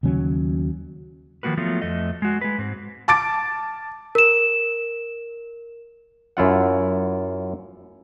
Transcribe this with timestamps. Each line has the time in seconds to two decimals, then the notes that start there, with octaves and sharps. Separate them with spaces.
0.03 D#2 C#3 F#3 C#4
1.43 D#3 F3 A#3 F#4 B4
1.57 F3 F#3 A3 B3 F4
1.82 F2 A3 D#5
2.22 G#3 F#4
2.41 G#3 B4
2.58 G#2 C4
3.08 A5 D6 A6 D7
4.15 A#4 E7
6.37 F#2 E4 F4 F#5